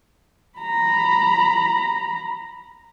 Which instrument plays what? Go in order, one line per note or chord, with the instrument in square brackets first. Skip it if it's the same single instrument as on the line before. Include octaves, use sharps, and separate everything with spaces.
[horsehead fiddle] A#5 B5